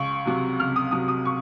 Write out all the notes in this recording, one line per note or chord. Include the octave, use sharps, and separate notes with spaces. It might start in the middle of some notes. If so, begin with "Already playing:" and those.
Already playing: C#2 C#6
C3 F#3
C#2 F6
D#6
C3 F#3 D#6
D#6
C#6